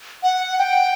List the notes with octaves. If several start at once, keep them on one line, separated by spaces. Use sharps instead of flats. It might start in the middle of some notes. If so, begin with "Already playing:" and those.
F#5
G5